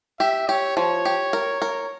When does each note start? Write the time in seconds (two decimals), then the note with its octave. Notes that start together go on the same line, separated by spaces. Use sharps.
0.20 G4 E5
0.48 G4 C#5
0.77 F3 C#5
1.05 G4
1.33 A#4
1.62 A#4